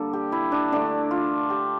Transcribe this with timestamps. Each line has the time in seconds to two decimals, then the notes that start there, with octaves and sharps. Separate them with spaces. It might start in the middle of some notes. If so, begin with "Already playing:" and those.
Already playing: D3 G3 A#3 A4
0.13 G4
0.32 E4
0.52 D4
0.72 D3 A3 D4
1.11 F4
1.50 G4